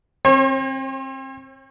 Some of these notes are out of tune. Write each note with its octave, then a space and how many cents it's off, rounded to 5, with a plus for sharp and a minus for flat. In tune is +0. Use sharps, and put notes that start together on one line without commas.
C4 +30 C#5 -45